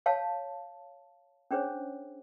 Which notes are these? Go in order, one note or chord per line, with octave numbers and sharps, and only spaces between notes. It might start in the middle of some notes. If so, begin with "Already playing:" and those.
C#5 F5 A5
C#4 D4 G#4 C5 C#5